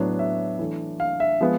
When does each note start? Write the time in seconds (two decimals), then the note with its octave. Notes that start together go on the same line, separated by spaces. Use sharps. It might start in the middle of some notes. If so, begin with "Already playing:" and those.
Already playing: A2 F#3 B3 D4
0.19 E5
0.59 E3 A3 D4
1.00 F5
1.20 E5
1.41 F3 G#3 B3